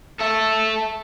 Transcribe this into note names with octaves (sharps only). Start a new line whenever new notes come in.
A4 E5